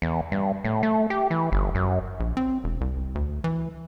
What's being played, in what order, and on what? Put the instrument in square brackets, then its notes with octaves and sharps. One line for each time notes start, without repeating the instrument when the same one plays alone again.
[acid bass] E2
G2
A2
A3
G4
E3
G1
F#2
[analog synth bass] A#1
C4
E1
C2
D2
E3